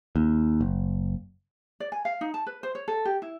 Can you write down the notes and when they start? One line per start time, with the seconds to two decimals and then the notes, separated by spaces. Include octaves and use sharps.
0.16 D#2
0.61 F#1
1.80 D5
1.92 G#5
2.05 F5
2.21 D#4
2.34 A5
2.46 B4
2.63 C5
2.75 C#5
2.88 A4
3.05 G4
3.22 E4